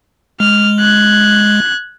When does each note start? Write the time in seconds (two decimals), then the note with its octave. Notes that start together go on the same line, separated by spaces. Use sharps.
0.40 G#3 F6
0.80 F#6 G#6